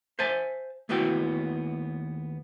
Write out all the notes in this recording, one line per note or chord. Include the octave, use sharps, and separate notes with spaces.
C5 E5 G#5 A5
D#2 A3 B3 E4 F#4 G5